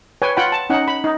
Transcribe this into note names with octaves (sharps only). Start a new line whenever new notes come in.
B4 C#5 G5 G#5
F4 F#5 G5 B5
A5
C#4 D#4 F#5
B5
D#4